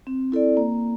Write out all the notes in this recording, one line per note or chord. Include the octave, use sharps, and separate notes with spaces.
C4
E4 A4 D5
A#3